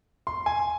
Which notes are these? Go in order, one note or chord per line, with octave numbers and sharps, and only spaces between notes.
C6
G#5